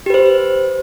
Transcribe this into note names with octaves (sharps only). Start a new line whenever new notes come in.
G4 B4 C5